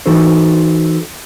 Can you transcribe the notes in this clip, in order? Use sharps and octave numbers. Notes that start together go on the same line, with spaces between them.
E3 D#4 F#4 A4 C5